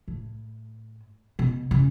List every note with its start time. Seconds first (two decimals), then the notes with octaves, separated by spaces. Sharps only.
0.08 A2
1.39 B2
1.71 C#3